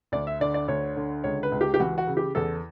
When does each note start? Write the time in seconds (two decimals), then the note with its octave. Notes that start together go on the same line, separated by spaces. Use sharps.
0.12 D2 D5
0.27 E5
0.40 D3 D5
0.54 D5
0.68 D2 C#5
0.96 D3
1.24 C#2 C#5
1.43 B4
1.52 C#2
1.61 G4
1.74 G4
1.80 E3 F#4
1.98 F#4
2.07 C#3
2.17 G4
2.35 E2 A4